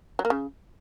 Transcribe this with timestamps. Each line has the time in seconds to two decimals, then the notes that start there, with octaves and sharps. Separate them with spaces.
0.19 F#3
0.25 A#3
0.30 C#3